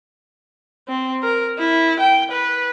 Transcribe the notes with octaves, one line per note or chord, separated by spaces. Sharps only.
C4
A#4
E4
G5
B4